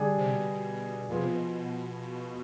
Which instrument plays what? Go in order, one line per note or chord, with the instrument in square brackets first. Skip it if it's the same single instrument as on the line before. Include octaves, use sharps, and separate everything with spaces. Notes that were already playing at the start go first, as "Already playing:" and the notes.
Already playing: [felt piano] D3 G3 D4 G#4
[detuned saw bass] C3
B2
[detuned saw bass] B2 [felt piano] F3 B3 F4 G#4
[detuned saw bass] C3
B2